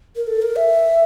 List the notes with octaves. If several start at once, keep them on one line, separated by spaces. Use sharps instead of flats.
A#4
A4
A#4
E5